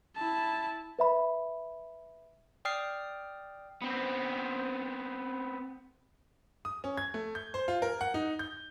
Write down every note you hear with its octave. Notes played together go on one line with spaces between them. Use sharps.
E4 A5
B4 E5 B5
D5 G5 D#6 F6 C7
B3 C4
D#6
C#4
G#6
A3
G6
C5
F4
A#4
F#5
D#4
G6